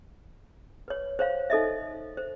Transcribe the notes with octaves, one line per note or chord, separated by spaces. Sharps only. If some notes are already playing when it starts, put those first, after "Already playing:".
B4 C#5
C5 C#5 F5
D#4 A4 D#5 E5
C5